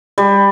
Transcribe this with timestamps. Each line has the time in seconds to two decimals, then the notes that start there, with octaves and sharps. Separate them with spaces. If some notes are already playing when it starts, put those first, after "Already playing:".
0.18 G3